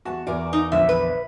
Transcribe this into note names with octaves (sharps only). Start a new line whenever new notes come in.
E2 F#4 A5
E2 A#4 D5
D#4
A#1 D3 E5
B4